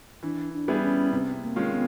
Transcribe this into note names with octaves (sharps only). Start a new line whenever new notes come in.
E3 D4
D4
G3 B3 E4 G#4
C#4
C3 C4
A#3
D#3 G#3 C#4 F4
B3